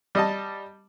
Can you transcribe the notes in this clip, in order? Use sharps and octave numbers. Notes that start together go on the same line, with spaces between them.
G3 D#5 A5